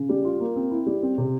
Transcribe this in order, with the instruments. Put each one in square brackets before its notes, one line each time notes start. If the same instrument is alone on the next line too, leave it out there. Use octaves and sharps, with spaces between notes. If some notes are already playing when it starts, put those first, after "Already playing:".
Already playing: [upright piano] C#3
G3
F4
A#3
C4
E4
G3
C4
C3